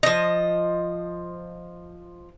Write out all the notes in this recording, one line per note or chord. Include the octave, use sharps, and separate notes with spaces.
F3 D#5